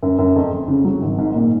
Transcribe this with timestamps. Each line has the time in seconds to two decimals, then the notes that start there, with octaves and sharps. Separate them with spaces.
0.02 F#2
0.19 F#2
0.36 F2
0.52 F2
0.68 C#3
0.85 F#3
1.02 G#1
1.19 G#2
1.35 A#2